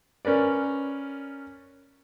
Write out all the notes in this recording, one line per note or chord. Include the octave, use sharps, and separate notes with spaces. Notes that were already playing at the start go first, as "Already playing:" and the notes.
C#4 A#4 B4 D5